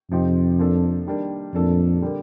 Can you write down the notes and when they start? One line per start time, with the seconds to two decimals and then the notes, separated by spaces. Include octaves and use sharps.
0.11 F2 C3 F3 C4 D#4 G4
0.59 F3 A#3 D4 A4
1.06 D#3 G3 A#3 D4
1.54 F2 A#2 A3 D4 A4 D5
2.02 D3 G3 A#3